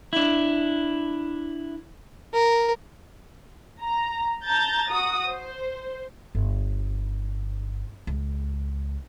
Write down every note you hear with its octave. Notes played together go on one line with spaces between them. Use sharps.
D4 E4
A#4
A#5
A5 A#5 G6 A6
F#4 D#6
C5
G1
C#2